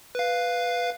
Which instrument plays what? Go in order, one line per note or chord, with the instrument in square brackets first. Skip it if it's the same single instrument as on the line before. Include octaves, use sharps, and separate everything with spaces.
[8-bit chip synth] B4 F5